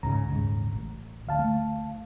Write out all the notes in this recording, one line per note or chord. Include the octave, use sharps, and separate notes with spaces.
C#2 G#2 C#3 A#5
D#1 G#2 C#3
A1
D2 F5 A5
A3